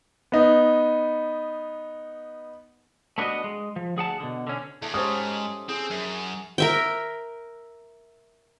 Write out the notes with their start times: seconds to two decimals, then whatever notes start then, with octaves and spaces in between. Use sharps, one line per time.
0.32 B3 D#4
3.18 A3 B3 D4 D#4 F#4 D#5
3.44 G#3
3.76 F3
3.96 D2 G#4 F#5 A5
4.20 B2 D3
4.47 D3 C#4
4.82 E2 A3
4.94 G#2 C#4 G4 A4 C5 D#6
5.69 C4 G#4
5.90 F#2
6.58 A#4 E5 G5